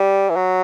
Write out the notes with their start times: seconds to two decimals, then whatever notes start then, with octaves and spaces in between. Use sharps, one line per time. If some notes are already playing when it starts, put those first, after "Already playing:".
Already playing: G3
0.30 E3
0.36 F#3